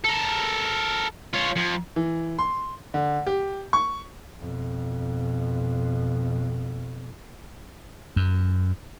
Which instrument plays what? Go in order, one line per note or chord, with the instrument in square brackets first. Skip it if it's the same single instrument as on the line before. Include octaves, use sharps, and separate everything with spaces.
[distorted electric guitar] A4 A#4
F4 C#5
F2
[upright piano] E3
C6
D3
G4
C#6
[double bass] F2 B2
[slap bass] F#2